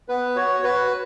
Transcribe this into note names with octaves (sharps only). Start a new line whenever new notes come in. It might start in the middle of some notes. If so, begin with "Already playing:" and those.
B3 B4
F#4 C#5
F#4 B4